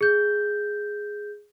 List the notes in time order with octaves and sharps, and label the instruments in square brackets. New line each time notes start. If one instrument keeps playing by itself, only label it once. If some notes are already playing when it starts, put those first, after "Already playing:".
[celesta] G#4 G6